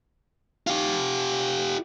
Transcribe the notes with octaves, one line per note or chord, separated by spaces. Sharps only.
F4 G4